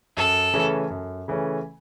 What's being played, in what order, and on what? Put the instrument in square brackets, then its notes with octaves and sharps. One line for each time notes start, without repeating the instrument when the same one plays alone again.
[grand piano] F#2 [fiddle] A4
[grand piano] C#3 E3 A3 C#4
F#2
C#3 E3 A3 C#4